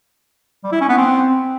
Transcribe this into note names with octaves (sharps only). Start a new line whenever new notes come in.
G3
E4
C#4
B3
C4